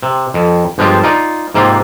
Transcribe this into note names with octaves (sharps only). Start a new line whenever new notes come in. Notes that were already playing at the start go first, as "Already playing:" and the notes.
C3
F2
G1 F3 G#3 F4 G4 A5
D#4 F4 D5
G#2 C3 A#3 F4 G4